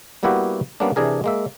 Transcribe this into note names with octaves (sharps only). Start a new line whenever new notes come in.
G3 A#3 B3 E4 F#4 G4
G3 A#3 B3 C#4 D4
C3 E3 D4 G#4 A#4
G#3 A#3 E5